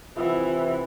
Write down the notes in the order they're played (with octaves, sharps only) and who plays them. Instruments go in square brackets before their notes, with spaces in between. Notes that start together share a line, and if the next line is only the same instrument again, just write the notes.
[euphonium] C3 [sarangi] E3 [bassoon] E4 [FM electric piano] F4 F#5